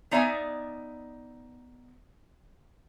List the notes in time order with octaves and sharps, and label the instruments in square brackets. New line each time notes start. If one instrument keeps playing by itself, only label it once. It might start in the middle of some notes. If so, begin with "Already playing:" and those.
[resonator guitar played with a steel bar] B3 D#4 D5 E5 G5 G#5